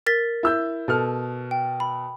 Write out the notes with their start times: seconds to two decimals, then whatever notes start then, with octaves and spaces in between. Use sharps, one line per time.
0.06 A#4 A6 B6
0.43 E4 E6 G6
0.88 B2 A4 F6
1.51 G5
1.80 B5